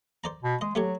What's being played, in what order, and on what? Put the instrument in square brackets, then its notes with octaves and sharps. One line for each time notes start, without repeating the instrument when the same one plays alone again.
[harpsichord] C5 D5 A#5
[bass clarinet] B2
[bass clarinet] G#3 [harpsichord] D#5
[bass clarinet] F#3 [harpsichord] A3 G4 C#5